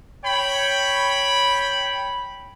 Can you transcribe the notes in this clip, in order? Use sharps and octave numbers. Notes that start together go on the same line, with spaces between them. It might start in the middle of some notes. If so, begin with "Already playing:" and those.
C#5 G5 B5